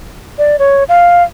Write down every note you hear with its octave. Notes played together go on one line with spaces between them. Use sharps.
D5
C#5
F5